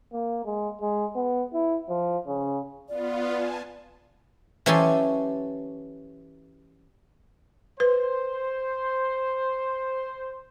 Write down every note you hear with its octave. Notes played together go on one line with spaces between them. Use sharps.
A#3
G#3
G#3
B3
E4
F3
C#3
B3 F4 D5
G#5 A5
E3 F#3 C#4 G4 A4 C6
B4 C5